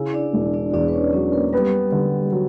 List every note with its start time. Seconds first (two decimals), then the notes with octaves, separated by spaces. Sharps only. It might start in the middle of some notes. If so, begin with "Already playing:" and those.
Already playing: C#3 E4
0.14 D4 D5
0.33 E1
0.54 D4 D5
0.73 E2 D4 D5
0.88 B4
0.93 C#4 C#5
1.13 F#3 C#4 C#5
1.33 A#3 A#4
1.53 G3 B3 G4
1.92 D3
2.32 F#3